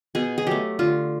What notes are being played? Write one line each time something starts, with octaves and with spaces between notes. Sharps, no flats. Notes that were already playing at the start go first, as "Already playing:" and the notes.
B2 G#4
G#4
F#3 A3 G4
D3 F4